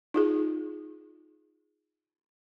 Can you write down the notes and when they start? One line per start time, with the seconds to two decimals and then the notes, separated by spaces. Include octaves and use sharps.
0.14 D#4 F4 G#4